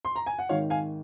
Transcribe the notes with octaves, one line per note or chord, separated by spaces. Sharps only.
C6
A#5
G#5
F#5
G#1 G#2 D#3 C#5 F5
F5 G#5